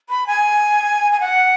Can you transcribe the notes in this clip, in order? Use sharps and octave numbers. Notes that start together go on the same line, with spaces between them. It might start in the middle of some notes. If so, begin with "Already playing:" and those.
B5
G#5
G#5
F#5